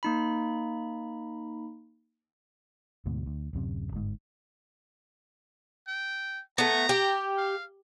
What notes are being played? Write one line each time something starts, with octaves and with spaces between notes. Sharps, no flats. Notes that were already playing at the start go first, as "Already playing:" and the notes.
A#3 D#4 B5
D2 G#2 B2
D2
D1 F#2 C3
G1 G#2
G5
A3 B3 A#5
G4
F5